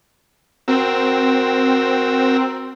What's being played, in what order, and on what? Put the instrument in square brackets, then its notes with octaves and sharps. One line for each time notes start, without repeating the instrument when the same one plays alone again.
[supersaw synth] C4 [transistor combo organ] F#4 A#4 E6